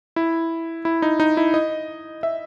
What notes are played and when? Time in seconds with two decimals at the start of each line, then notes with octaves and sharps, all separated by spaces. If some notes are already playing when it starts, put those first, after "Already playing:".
0.16 E4
0.85 E4
1.02 D#4
1.20 D#4
1.37 E4
1.54 D#5
2.23 E5